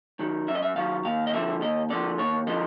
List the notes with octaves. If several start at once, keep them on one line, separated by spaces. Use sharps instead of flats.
D#3 F#3
F#2 E5
D#5
E5
D#3 F#3 F5
D#2 F5
D#5
D3 F3 E5
D#2 D#5
D3 F3 D5
D#2 C#5
D3 F3 D#5